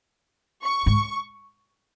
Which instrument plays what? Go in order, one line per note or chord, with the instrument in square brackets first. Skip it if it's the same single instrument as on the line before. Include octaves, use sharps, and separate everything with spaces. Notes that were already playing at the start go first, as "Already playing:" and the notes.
[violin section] C#6
[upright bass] G#2